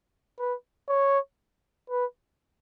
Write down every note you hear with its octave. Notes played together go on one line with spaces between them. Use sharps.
B4
C#5
B4